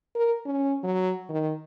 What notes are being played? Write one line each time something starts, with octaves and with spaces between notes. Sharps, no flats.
A#4
C#4
F#3
D#3